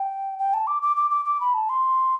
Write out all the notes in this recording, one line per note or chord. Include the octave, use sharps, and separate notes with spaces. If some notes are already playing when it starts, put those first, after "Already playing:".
Already playing: G5
G5
A5
D6
D6
D6
D6
D6
B5
A5
C6